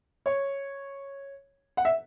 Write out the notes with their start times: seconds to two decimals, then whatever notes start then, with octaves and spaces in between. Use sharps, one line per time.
0.26 C#5
1.77 F#5
1.85 E5